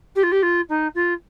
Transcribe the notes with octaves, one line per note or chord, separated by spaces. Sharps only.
G4
F4
G4
F4
D#4
F4